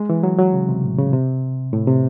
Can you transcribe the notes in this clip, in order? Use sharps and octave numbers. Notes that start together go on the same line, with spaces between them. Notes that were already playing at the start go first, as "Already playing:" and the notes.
Already playing: G#3
E3
F#3
F#3
C#3
C3
A2
C#3
C3
A2
C3